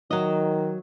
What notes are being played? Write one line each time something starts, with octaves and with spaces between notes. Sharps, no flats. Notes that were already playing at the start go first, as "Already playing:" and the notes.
D#3 F#3 D#5